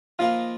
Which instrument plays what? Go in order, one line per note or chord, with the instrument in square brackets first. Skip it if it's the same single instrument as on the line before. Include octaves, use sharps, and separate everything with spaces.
[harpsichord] F3 A#3 D#4 G#4 B4 [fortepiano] F4